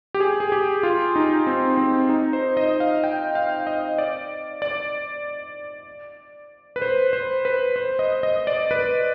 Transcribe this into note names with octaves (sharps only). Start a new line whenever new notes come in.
G4
G#4
G#4
G4
F4
D#4
C4
C4
D#4
C5
D#5
F5
G5
F5
D#5
D5
D5
B4
C5
C5
B4
C5
D#5
D#5
D5
B4